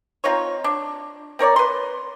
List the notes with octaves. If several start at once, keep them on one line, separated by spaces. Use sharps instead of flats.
C4 D#4 F4 C#5
D4
C4 A#4 C#5 D5
B4 C6